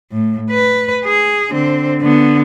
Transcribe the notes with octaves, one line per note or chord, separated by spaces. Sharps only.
A2
B4
G#4
D3 C4
D3 B3